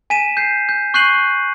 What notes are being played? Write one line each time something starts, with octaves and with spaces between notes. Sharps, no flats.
G#5 B6 D#7 E7
G6 C7
G6
C#6 F#6 G6 C7 D#7 F#7